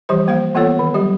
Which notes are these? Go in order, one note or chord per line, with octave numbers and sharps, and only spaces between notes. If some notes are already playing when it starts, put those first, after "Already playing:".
E3 F3 G3 G4 C5
F3 A#3 C5 F5
E3 A#3 B3 F4 A4 C#5
D#3
F#3 G3 G4